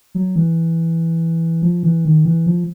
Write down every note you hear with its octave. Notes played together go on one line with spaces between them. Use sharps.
F#3
E3
F3
E3
D#3
E3
F3